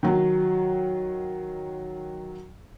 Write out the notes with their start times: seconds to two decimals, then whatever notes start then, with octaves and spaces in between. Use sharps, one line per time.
0.03 D#3 F#3